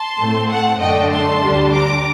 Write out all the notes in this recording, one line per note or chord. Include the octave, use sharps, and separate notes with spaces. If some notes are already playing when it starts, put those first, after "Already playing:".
Already playing: A5 C6
A2 A3 C4
F#5 A5
F#2 D3 A3 D4 D#5 G5
A5 C6
D2 D3 G3 D4
A#5 D6